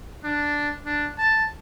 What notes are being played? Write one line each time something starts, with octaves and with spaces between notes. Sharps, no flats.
D4
D4
A5